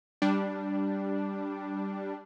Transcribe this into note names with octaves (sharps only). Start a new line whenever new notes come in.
G3 D4